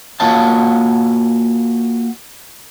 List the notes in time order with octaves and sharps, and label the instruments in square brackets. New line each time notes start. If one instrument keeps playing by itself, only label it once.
[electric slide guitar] A#3 F4 F#4 C#5 D#5 A5